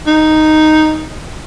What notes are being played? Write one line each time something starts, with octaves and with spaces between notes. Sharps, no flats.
D#4